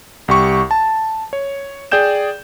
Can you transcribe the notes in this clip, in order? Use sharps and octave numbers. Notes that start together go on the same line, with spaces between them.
C2 G4 C#6
A5
C#5
G#4 D5 G5 G6 E7